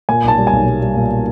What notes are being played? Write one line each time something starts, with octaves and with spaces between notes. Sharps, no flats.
A#2 G#5
B1 A5
G3
G#5
B1
G3
G3
A#2